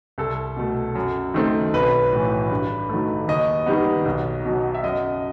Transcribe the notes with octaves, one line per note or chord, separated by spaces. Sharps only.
C2 A4
B2 A3
F#2
D#3 A3 C4
B1 B4
A2 E3
G2
D#3 F#3 A3
D#2 D#5
D#3 G3 B3
B1
B2 F#3
E5
F#2 D#5